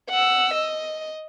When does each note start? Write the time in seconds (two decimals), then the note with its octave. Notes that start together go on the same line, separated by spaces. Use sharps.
0.10 F#5 E6
0.54 D#5